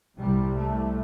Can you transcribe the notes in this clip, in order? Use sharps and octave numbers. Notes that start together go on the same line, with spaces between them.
C2 C3 G3
A3